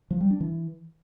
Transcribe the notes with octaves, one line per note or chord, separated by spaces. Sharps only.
F3
G3
D4
E3